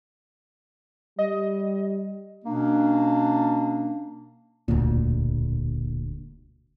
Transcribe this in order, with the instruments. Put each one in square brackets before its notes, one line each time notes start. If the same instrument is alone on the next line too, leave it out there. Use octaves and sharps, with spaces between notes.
[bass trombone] G3 [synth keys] D#5
[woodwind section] B2 A#3 C#4 D4
[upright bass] E1 D2 [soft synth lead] A#2